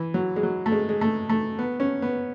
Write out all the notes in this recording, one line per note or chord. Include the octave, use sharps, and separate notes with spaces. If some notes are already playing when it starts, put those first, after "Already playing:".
Already playing: E3
F#3
G#3
F#3
A3
G#3
G#3
A3
A3
B3
C#4
B3